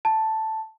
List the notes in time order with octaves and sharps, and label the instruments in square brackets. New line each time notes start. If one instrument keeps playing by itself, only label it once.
[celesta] A5